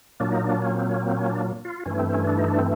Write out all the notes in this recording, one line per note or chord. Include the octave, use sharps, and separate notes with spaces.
A#2 F#3 A#3 D4
D#4
D4
C#4
C4
C#4
C4
C#4
D4
F4
G2 E3 A3 C#4
C4
C4
C#4
D4
D#4
D4
C4